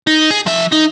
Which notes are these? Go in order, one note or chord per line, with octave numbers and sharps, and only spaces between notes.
D#4
G#4
F3 E5
D#4